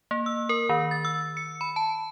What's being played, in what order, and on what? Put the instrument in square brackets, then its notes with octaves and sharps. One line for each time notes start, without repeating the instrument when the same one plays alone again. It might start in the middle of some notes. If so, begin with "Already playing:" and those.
[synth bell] A#3
E6
A#4
D#3
A6
E6
C#7
B5
A5